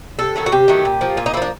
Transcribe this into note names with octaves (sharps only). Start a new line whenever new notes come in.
C3 A4
D#3 F#3 A3
F#4
C3 G4
D#3 F#3 A3
A#2
F3 A#3
A#2 F4
D#4
F3 A#3 D4 E4